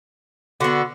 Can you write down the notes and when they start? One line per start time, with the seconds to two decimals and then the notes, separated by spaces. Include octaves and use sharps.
0.61 D3 B3 F#4